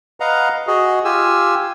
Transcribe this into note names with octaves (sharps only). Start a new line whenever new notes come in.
B4 D#5 F5 F#5 A#5
F#4 G#4 D#5
F4 G4 G#5 E6